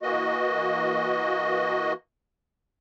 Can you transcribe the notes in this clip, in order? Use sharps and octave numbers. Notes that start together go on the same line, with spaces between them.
E3 A#3 F#4 D#5